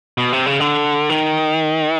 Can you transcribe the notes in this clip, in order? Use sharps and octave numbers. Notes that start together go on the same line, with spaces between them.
B2
C3
C#3
D3
D#3